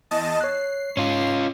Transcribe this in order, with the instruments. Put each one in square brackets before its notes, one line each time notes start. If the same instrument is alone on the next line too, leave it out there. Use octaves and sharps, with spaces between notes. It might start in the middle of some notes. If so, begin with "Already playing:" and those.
[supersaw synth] E2 D#5 A5
[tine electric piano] C#5 F#6 [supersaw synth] C7
[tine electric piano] G#2 [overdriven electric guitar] C#4 F4